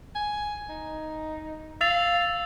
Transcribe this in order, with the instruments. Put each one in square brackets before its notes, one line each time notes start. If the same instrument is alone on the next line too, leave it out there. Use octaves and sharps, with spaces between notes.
[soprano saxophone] G#5
D#4
[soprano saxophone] F5 [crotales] E6 A6 F7